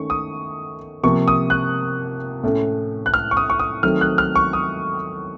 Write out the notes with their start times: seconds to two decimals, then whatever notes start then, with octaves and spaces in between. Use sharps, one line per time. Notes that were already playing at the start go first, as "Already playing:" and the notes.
Already playing: D#3 A3 C#4 C#6
0.10 D#6
1.03 C3 F3 A#3 C#6
1.28 D#6
1.50 F#6
2.43 A2 A3 C#4
3.06 F#6
3.14 F6
3.31 C#6
3.37 D#6
3.50 C#6
3.59 D#6
3.83 D#3 F#3 A3 C4 F6
4.01 F#6
4.18 F6
4.36 C#6
4.53 D#6